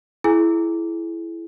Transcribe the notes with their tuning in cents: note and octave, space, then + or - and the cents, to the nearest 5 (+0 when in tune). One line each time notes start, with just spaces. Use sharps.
E4 +15 G#4 +35 G#5 -10